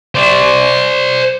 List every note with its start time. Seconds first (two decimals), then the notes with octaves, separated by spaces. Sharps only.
0.15 C5 D5